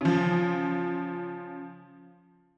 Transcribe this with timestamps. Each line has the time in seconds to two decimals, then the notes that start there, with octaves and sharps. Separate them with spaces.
0.01 C#3 F3